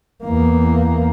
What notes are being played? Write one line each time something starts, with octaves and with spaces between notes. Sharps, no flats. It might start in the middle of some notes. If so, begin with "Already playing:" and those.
E2 A#3